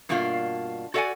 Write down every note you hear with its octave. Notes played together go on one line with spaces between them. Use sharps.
G2 B2 A#3 D4 F4 F5
F#4 A4 D5 E5 F#5 G#5